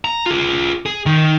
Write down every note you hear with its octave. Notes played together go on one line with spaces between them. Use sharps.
A#5
F4 G#4
G#4
D#3